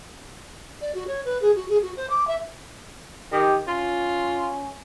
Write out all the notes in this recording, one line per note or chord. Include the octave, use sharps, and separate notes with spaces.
D5
F#4
C#5
B4
G#4
F#4
G#4
F#4
C5
D6
E5
D#3 G4
C#4 F4